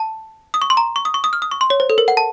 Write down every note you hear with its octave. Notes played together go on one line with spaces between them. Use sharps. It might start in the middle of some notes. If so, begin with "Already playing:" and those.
Already playing: A5
D#6
C#6
C6
A#5
C#6
D#6
C#6
D#6
F6
D#6
C#6
C6
C#5
C5
A4
A#4
F#5
A5